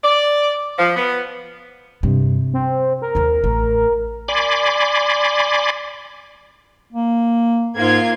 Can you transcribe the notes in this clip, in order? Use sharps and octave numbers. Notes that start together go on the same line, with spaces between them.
D5
F3
B3
G2 C3
C4
A#4
D#2 D#3
A1 A3
D5 G#5 B5 C6 D6
A#3
G#2 A#3 F4 G#6